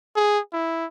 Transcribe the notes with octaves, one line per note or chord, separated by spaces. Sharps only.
G#4
E4